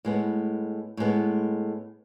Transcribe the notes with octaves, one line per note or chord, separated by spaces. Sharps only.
A2 G#3 B3
A2 G#3 B3